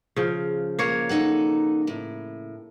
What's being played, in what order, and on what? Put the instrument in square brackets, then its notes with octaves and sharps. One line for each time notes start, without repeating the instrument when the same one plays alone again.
[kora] C#3 F3
A#3 C#5
[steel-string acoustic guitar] D#4 A4 F#5
A2